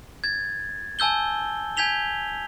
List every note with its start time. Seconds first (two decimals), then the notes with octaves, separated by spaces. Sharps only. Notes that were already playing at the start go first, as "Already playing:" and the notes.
0.24 G#6 A6
0.99 G#5 A5 E6 G6 G7
1.77 G#5 G6 G#6 B6 F7 G7